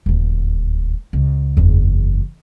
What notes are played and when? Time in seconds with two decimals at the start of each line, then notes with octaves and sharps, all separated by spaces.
0.06 D#1 D2
1.13 C#2
1.57 F#1 E2